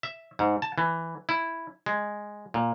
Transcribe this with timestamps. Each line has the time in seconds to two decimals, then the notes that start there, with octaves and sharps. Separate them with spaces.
0.03 E5
0.39 G#2
0.62 A5
0.78 E3
1.29 E4
1.86 G#3
2.54 A#2